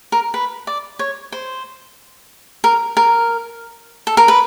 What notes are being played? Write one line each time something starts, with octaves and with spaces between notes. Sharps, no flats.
A#4
B4
D5
C#5
C5
A#4
A#4
A4
A#4
B4